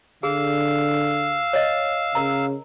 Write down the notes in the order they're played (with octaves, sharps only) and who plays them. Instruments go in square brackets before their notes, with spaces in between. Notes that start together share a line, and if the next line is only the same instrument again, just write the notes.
[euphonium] D3 [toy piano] G#4 [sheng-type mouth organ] F5 E6
[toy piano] C#5 D#5
[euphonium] C#3 [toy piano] A#4 A#5